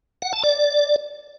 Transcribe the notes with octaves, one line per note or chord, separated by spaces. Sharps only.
F#5
A5
D5